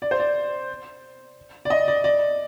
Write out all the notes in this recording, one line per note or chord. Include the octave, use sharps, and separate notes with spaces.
D5
C5
D5
D5
D#5
D5
D5